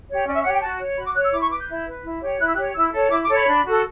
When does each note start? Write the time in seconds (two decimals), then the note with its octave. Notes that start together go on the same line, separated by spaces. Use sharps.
0.09 G4 C#5
0.26 C#4 D5
0.35 E5
0.44 G4 C#5 F#5
0.53 G5
0.62 F#4 A5
0.79 C#5
0.97 F#4 B5
1.06 D6
1.15 C#5 F#6
1.24 E6
1.33 E4 D6
1.41 C#6
1.51 B4 D6
1.59 G6
1.68 E4
1.86 B4
2.04 E4
2.22 G4 C#5
2.40 E4 F#6
2.47 E6
2.55 G4 C#5 F#6
2.75 E4 E6
2.93 A4 C#5
3.10 E4 D6
3.23 D6
3.29 A4 C#5
3.35 B5
3.46 D4
3.64 F#4 A4